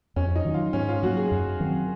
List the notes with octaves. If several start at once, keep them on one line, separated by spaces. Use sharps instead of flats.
F2 C#4
D#4
D#3 F#3
F4
G#2 C#4
F4
F#3 A#3 F#4
G#4
F#2
D#3 F#3 C4